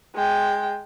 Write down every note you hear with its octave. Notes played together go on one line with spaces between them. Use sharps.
G#3 G5